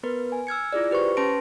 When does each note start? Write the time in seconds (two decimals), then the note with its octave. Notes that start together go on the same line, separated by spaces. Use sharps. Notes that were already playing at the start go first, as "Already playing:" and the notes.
0.03 B3 A#4 B4
0.32 G#5
0.47 E6 F6 G#6 C#7
0.73 E4 F4 G#4 D5
0.91 G4 B4 C5 C#6
1.17 C#4 B4 A5 C6 A#6 D7